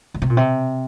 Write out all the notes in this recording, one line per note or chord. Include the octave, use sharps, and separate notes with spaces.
D3
C3
A#2
C3